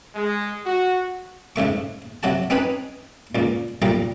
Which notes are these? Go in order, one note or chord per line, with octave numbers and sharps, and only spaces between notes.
G#3
F#4
G#2 C#3 A3 C#6
C3 F#3 F#4 A5
C4 C#4 D#4 B4 G#5
C#2 A#2
B1 A#2 G3 A#5